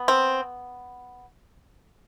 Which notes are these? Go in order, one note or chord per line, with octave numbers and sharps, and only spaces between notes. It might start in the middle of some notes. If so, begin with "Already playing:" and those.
Already playing: B3
C4